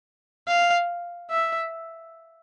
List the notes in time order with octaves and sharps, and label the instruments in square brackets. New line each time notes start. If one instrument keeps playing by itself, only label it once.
[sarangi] F5
E5